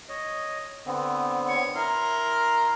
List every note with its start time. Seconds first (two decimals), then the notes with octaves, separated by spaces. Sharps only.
0.09 C#5 D#5
0.86 D3 B3 C4
1.48 C#5
1.75 E4 A#4 C6